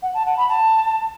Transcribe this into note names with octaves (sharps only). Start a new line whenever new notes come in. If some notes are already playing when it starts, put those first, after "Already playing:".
F#5
A5
F#5
B5
A5